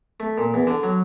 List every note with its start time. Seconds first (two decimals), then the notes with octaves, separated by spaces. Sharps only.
0.20 A3
0.38 A#2
0.54 E2
0.67 D3
0.83 F#3